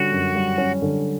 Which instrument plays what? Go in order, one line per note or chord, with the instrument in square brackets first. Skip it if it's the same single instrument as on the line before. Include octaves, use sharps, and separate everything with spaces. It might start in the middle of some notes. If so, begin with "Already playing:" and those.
Already playing: [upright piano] D3 G3 C#4 [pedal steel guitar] F#4
[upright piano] F#2
G3
C#4
D3